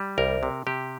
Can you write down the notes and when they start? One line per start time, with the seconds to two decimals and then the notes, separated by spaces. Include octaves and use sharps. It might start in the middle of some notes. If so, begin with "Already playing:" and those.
Already playing: G3
0.18 C2 A#4
0.43 C3
0.67 C3 G4